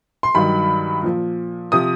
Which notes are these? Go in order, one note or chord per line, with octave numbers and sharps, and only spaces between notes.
C6
G2 D#3 F#3 B5
A#2 F3
C3 F3 D#6